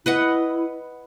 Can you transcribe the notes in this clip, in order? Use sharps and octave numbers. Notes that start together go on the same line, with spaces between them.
E4 B4 D#5 F#5